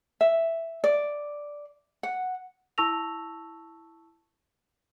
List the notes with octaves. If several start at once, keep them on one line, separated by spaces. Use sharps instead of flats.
E5
D5
F#5
E4 A5 C#6 E6 A#6 F7